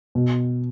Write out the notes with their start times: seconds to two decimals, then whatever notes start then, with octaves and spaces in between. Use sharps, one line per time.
0.15 B2